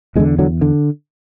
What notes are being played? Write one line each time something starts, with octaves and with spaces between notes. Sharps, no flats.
E2 D3 E3 G#3
D3 F#3
D3